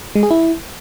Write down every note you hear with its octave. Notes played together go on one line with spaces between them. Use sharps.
G#3
G#4
E4